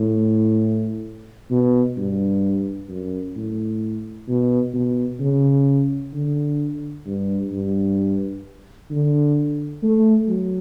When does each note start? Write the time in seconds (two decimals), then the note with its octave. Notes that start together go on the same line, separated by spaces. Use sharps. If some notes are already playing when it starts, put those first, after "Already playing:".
Already playing: A2
1.51 B2
1.97 G2
2.89 F#2
3.36 A2
4.28 B2
4.74 B2
5.20 C#3
6.13 D3
7.06 G2
7.51 G2
8.91 D3
9.83 A3
10.28 F#3